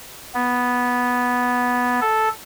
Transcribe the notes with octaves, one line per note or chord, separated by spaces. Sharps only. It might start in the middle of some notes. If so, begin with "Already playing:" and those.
B3
A4